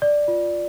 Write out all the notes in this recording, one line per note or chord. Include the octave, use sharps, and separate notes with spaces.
D5
F4